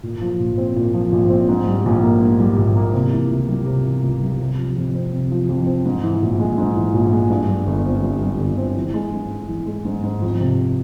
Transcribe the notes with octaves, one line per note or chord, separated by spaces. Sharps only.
A#2
F3
A#1
C4
A#2
F3
A#1
C4
G#2
G3
A#1
A#3
G#2
G3
A#1
A#3
C3
E3
C#2
G3
C3
E3
C#2
G3
C3
F3
F2
C4
C3
F3
F2
C4
G#2
E3
A#1
G#3
G#2
E3
A#1
G#3
G2
G3
G1
C4
G2
G3
G1
C4
E3
G#3
G#2
G#2
E3
G#3
G#2
G#2
F2
C3